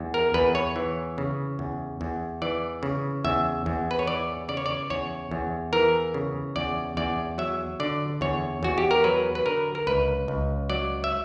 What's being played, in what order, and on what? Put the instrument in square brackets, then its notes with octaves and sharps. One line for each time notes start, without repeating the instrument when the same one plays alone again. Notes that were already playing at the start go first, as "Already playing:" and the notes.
Already playing: [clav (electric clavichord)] E2
A#4
E2 B4
C#5
E3
C#3
E2
E2
E3 D5
C#3
E2 E5
E2
B4
C#5
E3 D5
C#3 D5
C#5
D5
E2 C#5
E2
E3 A#4
C#3
E2 D5
E2 D5
F#3 E5
D3 D5
E2 C#5
E2 F#4
G4
A#4
F#3 B4
B4
D3 A#4
A#4
C#2 B4
C#2
F#3 D5
E5